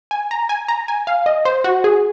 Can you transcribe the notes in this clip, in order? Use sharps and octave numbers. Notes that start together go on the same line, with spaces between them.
G#5
A#5
G#5
A#5
G#5
F5
D#5
C5
F#4
G#4